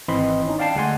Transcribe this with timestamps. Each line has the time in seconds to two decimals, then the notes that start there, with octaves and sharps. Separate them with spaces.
0.08 G#1 E3 C4 D#5 B5 C6
0.47 C#4 D#4
0.59 D5 F5 G5 A5 C7
0.75 D2 G#3 F#5 G#5 C6